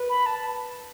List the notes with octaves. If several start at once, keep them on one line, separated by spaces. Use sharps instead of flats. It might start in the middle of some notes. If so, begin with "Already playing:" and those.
Already playing: B4
B5
A5